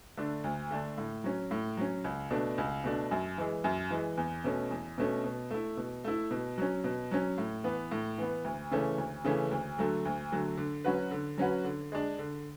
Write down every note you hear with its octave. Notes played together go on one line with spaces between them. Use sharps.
D3 A3 D4
D2
D3 A3 D4
A2
F#3 C#4
A2
F#3 C#4
C#2
B2 A3 D4
C#2
B2 A3 D4
F#2
E3 G#3
F#2
E3 G#3
E2
B2 A3 C#4
E2
B2 A3 C#4
B2
A3 E4
B2
A3 E4
B2
F#3 C#4
B2
F#3 C#4
A2
E3 B3
A2
E3 B3
D2
C#3 E3 A3 C#4
D2
C#3 E3 A3 C#4
D2
D3 F#3 A3
D2
D3 F#3 A3
D3
F#3 C#4 F#4 B4
D3
F#3 C#4 F#4 B4
D3
G#3 D4
D3